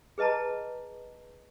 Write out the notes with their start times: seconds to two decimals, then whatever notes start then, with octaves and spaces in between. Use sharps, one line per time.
0.18 G#4 B4 D#5 A5 A#5